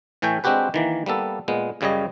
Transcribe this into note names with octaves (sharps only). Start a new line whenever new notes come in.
A2 E3 A3 C#5 G5 G#5
G#3 C4 D4 F#4 G4 B4
D#3 E3 A#3
G3 A#3 B3 A4
A#2 G#3 B3
F#2 C#3 G3 C#5 D#5